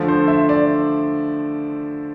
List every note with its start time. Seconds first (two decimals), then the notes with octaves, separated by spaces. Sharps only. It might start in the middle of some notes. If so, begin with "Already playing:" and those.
Already playing: D3 F3 A3
0.08 C5
0.28 E5
0.49 D5